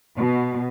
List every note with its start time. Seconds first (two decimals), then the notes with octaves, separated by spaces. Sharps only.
0.15 B2